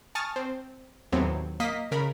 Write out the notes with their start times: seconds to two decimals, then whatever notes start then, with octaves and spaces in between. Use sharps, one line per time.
0.15 G#5 A5 C#6 D#6 F6 A6
0.36 C4
1.12 D#2 A2 F#3 B3 C4
1.60 A#3 D#5 F5 B6
1.92 C#3 A#4 B5